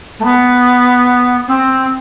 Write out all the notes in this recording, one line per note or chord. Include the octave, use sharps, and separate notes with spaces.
A3
B3
C4